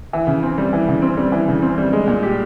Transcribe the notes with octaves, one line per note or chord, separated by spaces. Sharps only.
E3
C#3
C4
G3
E3
C#3
C4
G3
E3
C#3
C4
G3
G#3
A#2
G4